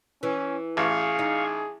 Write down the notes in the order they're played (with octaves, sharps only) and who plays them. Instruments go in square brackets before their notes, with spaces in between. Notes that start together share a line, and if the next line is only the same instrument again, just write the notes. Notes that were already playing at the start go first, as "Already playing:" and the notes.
[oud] E3 [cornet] C#4
[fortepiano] A1 [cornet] G#4 [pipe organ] F5 C#6
[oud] D#4